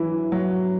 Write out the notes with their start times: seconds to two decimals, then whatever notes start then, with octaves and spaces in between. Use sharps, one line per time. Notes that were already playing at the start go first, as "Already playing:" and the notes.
Already playing: E3 F#3 E4
0.32 F#3